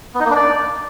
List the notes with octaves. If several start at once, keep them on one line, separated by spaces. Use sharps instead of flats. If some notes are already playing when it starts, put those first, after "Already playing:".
B3
D#4
A#3
D4
D5